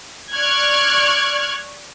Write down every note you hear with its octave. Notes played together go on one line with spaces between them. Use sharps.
D5 C#6 F6 F#6 G#6